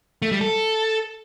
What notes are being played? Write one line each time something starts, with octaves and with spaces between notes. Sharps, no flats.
A3
G3
A4